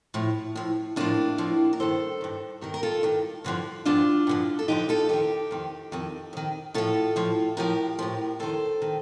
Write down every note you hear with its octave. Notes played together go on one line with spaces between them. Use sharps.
A2 F3
A2 F3
A2 F3 A#3 D4
A2 F3
A#4
G2 D#3 A4 C5
G2 D#3
G2 D#3 G4 A#4
A#4
F4 A4
G2 D#3
G2 D3 F3
G2 D3 F3 D4 F4
G2 D3 F3
A4
G2 D3 F3 D#4 G4
F4 A4
F2 D#3 D#4 G4
F2 D#3
F2 D#3
F2 D#3
A2 F3 F4 A4
A2 F3
A2 F3 G4 A#4
A2 F3
F2 D#3 A4 C5
D#3